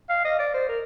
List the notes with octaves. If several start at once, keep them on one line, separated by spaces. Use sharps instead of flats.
F5
D#5
D5
C5
A#4